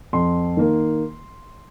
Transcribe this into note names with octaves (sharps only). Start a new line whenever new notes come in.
F2 C6
D#3 A#3